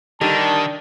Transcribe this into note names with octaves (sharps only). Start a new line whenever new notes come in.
D3 D#3 G3 D4 D#4 A4 A5